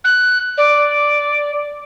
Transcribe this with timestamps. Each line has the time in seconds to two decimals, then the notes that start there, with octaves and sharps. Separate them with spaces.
0.04 F#6
0.58 D5